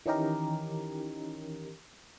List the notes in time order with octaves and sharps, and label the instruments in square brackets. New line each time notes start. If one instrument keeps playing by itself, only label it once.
[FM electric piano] D#3 E3 C#4 D#4 G4 A#4